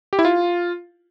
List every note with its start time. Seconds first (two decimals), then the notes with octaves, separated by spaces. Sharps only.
0.13 G4
0.19 E4
0.25 F4